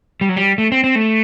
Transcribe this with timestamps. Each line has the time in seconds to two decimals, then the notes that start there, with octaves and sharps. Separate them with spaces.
0.21 G3
0.29 F#3
0.36 G3
0.58 A3
0.72 C4
0.84 C4
0.95 A3